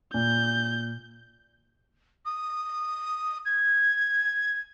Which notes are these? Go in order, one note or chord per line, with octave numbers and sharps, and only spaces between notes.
A#2 G6
D#6
G#6